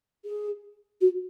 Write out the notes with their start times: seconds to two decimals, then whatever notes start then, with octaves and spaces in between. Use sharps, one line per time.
0.25 G#4
1.00 F#4